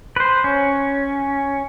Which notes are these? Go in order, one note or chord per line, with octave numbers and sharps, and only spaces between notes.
B4 C5
C#4